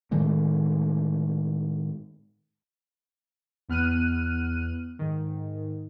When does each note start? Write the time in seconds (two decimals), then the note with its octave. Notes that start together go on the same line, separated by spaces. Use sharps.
0.11 A2 D#3 G#3 A3
3.69 E2 B3 F6 F#6 D#7
4.99 G#2 D#3